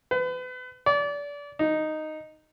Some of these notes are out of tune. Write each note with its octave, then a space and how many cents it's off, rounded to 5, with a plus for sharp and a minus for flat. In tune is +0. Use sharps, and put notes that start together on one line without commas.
B4 +35
D5 -30
D#4 -5